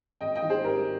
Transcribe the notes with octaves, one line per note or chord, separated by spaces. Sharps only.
G#1 D#5 G5
D#5 G5
D#3
G#4 C5
G#1 G4 A#4